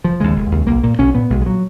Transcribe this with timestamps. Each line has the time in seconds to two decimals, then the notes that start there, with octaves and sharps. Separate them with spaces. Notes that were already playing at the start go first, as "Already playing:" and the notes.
0.04 F1 F3
0.20 D#2 C#3 G#3
0.36 F1
0.51 D#2 C#3
0.67 B1 A#3
0.83 A#2 A#3
0.99 B1 C#4
1.15 A#2 B3
1.30 B1 G#3
1.42 G#3
1.46 A#2 F#3